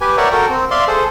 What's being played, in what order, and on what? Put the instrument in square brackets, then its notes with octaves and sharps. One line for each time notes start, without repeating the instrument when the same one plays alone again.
[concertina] G4 B4 G#5
A#4 C#5 D5 E5 F#5 G5
F#4 A4 A#4 G5
C4
D5 E5 F5 C6
G#4 A4 C5